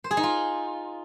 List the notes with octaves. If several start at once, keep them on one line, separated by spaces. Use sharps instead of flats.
C5
G#4
D#4
F4